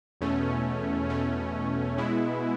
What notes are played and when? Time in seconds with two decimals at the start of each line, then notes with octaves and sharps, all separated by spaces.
0.21 E2 B2 A3 C#4
1.09 E2 B2 A3 C#4
1.97 B2 G#3 B3 E4